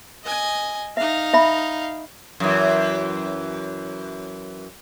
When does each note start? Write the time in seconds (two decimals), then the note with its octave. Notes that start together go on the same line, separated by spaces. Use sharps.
0.24 D#5 G#5
0.97 D#4 E5 F5
1.34 E5 B5
2.40 F#2 E3